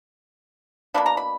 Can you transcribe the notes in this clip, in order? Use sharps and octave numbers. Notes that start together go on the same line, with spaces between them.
B2 F#3 A#3 D4 B5
A#5
B5